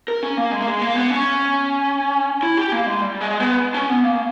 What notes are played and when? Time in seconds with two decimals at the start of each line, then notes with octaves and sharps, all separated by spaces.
0.08 A#4
0.23 C#4
0.37 A#3
0.52 G#3
0.62 A#3
0.67 G#3
0.81 A#3
0.96 B3
1.10 C#4
2.43 E4
2.57 G4
2.72 A#3
2.86 G#3
3.01 G3
3.21 G#3
3.40 B3
3.74 C#4
3.89 B3
4.04 A#3